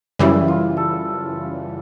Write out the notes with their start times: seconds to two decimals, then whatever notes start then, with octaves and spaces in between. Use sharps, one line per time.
0.19 F#2 C#3 E3 G3 E4
0.48 F4
0.77 A4